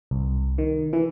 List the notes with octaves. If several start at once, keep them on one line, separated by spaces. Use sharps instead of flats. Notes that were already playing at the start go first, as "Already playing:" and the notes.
C2
D#3
E3